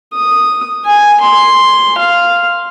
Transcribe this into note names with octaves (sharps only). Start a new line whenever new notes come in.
D#6
G#5
C6
F5